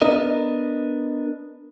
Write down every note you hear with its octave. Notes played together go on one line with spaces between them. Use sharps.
B3 D4 A#4 D#5